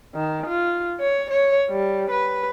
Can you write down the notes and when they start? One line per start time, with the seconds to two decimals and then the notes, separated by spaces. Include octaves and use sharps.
0.15 D#3
0.46 F4
1.00 C#5
1.30 C#5
1.70 G3
2.11 B4